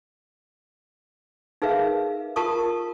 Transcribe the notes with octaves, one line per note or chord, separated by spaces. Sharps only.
D#4 G#4 A#4 B4 E5 F5
F4 A#4 A5 C#6 D#6